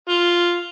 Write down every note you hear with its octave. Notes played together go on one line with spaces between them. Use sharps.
F4